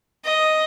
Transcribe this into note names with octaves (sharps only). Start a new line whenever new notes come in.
D#5